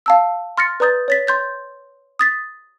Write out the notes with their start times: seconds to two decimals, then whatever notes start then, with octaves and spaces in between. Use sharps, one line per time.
0.06 F5 A5 E6
0.57 C6 F6 A6 A#6 C#7
0.80 B4 D5 A#5 D#6 G6 A6
1.08 C#5 A6 B6
1.27 C6 G6 A6
2.19 D#6 A6 B6